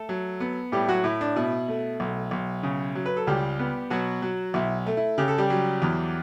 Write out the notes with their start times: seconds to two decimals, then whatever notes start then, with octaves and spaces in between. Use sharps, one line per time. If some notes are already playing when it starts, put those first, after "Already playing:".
Already playing: A3 A4
0.09 F#3
0.40 B3
0.72 A2 G3 G4
0.88 F#3 F#4
1.04 A2 E4
1.21 D4
1.36 B2 E4
1.68 A3
2.00 B1
2.31 B1
2.63 C#3
2.95 F#3
3.06 B4
3.17 A4
3.27 C#2 G3 G4
3.59 B3
3.90 B2 F#3 F#4
4.22 F#3
4.54 B1 E4
4.86 A3
4.97 E4
5.18 C#3 G4
5.28 A4
5.38 G3 G4
5.50 F#3
5.82 E2